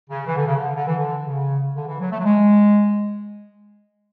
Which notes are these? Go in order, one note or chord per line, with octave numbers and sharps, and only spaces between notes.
C#3
E3
D3
C#3
D3
D3
E3
D3
C#3
D3
E3
F#3
A3
F#3
G#3